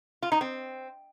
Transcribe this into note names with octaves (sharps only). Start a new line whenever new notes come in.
F4
D#4
C4